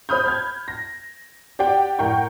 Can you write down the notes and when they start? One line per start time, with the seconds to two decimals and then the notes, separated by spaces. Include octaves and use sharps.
0.09 C5 C#5 B5 D#6 F6 G6
0.24 B5 F6 G#6
0.68 A#6
1.59 G4 D5 F#5 G5
1.99 A2 A#4 F#5 G5 C#6 G6